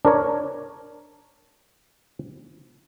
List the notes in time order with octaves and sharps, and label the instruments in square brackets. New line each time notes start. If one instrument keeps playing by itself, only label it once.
[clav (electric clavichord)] D4 A#4 C#5